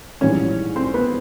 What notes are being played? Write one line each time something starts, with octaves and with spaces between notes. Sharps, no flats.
A#1 G#2 E3 G3 C#4 C#5
C4 C5
B3 B4